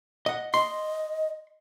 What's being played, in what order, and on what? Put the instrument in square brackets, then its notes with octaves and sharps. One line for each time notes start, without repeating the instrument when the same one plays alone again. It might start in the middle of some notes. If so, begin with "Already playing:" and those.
[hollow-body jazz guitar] D#5 F#5
[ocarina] D#5 [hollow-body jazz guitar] C6